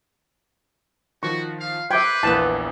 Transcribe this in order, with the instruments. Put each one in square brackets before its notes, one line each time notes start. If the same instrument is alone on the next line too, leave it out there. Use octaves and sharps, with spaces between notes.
[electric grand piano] D#3 F3 [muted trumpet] F#4 [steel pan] C#6
[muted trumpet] F5
[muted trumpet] B4 [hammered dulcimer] C5 D6 [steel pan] E5 G5 [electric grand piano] F#6 G#6
[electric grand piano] A#1 E2 A#3 [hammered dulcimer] E3 B3 [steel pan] A5